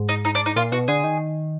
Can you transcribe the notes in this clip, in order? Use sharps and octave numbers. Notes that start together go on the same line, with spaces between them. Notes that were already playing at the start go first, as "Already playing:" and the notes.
Already playing: G#2
D#4
D#4
D4
D#4
A#2 F4
B2 F#4
D3 G#4
D#3